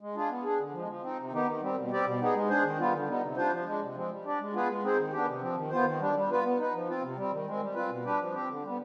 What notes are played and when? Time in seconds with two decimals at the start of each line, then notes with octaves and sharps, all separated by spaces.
0.01 G#3
0.15 D4 F4 G#4
0.29 B3
0.44 D4 G#4
0.59 D3
0.73 F3 G#3
0.88 F3
1.02 C4 D#4
1.18 C3
1.32 D#3 B3 D#4 G4
1.46 D#3
1.61 G3 C4
1.76 B2
1.91 G3 C4 G4 D5
2.05 B2
2.20 B3 D#4 G#4
2.34 G#3
2.49 D4 G#4 C5
2.64 D#3
2.78 G3 B3 F4
2.93 D3
3.08 G3 B3 D#4
3.22 C3
3.37 G3 D4 F4 C5
3.51 F3
3.66 G#3 D4
3.81 C3
3.95 F3 G#3 C4
4.10 G3
4.25 D4 G4 D5
4.40 G#3
4.53 B3 F4 G#4 B4
4.68 G#3
4.83 C4 D#4 G#4 C5
4.98 D#3
5.12 B3 D4 G4
5.27 C3
5.41 F3 C4
5.56 D#3
5.70 B3 F4 C5
5.85 D#3
6.00 G3 D4
6.15 G3
6.29 B3 F4 B4
6.43 B3
6.58 D#4 B4
6.73 F3
6.88 C4 F4
7.02 C3
7.17 G3 C4
7.31 D#3
7.47 G#3 C4
7.60 G3
7.75 C4 F4 B4
7.89 B2
8.04 G3 D4 G4 B4
8.20 F3
8.34 C4 G4
8.49 D3
8.63 G3 B3